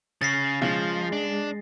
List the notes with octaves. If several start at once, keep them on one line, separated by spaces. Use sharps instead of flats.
C#3 A6 A#6 C7
C#3 F3 G#3
D4